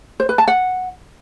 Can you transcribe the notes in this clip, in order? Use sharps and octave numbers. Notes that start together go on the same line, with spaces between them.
C5
B4
A5
F#5